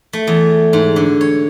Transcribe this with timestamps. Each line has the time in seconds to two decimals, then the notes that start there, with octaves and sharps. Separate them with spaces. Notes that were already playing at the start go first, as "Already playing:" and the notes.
0.13 A3
0.27 E2
0.73 G#2
0.96 D3
1.21 C#5